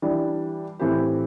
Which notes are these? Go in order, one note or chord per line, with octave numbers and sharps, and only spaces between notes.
E3 G3 D4
A2 E3 C4 G4